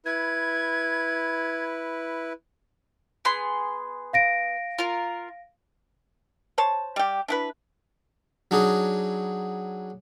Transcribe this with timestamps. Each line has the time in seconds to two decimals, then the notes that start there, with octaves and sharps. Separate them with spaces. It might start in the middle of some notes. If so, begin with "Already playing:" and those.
0.06 E4 B4 G#6
3.25 B3 G#4 C6
4.13 F5 A#6 D7
4.79 F4 A#4
6.58 C5 C#5 A5
6.96 G3 G4
7.28 D4 E4 B4
8.51 F#3 D4 D#4 G#4